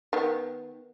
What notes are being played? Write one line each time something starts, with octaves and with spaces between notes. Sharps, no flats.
D#3 B3